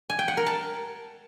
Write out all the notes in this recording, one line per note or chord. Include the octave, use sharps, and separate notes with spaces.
G#5
G5
F#5
A#4
A5